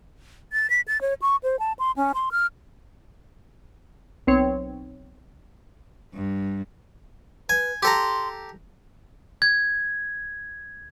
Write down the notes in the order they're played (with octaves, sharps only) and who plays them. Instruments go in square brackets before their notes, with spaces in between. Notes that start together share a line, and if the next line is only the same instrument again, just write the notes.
[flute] A6
B6
A6
C#5
C#6
C5
A5
C6
C#4
C6
F6
[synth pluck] B1 C4 C#5
[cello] G2
[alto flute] B4 [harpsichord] G#5
[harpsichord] G4 A4 A#5 [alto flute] C6
[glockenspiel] G#6